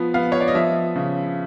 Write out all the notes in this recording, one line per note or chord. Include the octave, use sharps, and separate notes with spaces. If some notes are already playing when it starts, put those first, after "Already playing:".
Already playing: F3 B3
B3 F5
C#5
D5
D#5
F3 E5
C#3